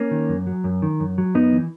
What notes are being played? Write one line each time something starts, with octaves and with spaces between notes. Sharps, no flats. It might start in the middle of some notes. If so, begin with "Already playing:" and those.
Already playing: A#3 C#4
D#3
F#2
F#3
F#2
D#3
F#2
F#3
F#2 B3 D#4
E3